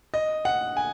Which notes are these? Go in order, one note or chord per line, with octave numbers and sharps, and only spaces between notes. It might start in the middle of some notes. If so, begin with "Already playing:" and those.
D#5
F#5
G#5